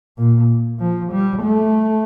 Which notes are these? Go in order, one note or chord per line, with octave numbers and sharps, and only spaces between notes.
A#2
F3
G3
A3